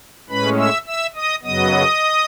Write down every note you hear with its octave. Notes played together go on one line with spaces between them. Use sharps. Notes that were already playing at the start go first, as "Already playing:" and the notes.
A2 G#3 C#4 B4 B5
E5 E6
E5 E6
D#5 D#6
F#2 C#3 F#3 B3 D#5 D#6